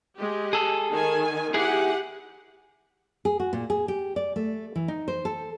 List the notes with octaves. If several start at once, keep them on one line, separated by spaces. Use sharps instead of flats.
G#3 G4
G#4 A4
D#3 G#5
E4 G4 G#4 F#5
G#4
F#4
A#2
G#4
G4
D5
A3
E3
D#4
C5
A4